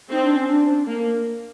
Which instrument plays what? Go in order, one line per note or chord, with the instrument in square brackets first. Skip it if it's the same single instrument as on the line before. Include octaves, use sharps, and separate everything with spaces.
[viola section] C4 [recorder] D#4
[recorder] D4
C#4
D4
[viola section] A#3